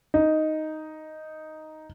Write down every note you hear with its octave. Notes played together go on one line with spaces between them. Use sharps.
D#4